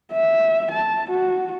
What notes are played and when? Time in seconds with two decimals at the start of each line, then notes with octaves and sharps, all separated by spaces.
0.12 E5
0.71 A5
1.10 F#4